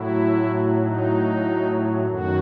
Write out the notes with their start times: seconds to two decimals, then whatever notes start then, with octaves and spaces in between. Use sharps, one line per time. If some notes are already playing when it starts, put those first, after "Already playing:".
Already playing: A2 F#3 E4
0.80 D#4
2.06 F#2 D#3 F#3 F#4